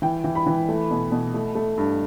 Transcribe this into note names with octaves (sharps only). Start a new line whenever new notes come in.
E3 G5
E3
B5
E3
A3
B2
B2
A3
A3
G2